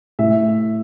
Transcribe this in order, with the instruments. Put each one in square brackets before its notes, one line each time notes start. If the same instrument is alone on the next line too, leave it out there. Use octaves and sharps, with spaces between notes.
[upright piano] A2 E5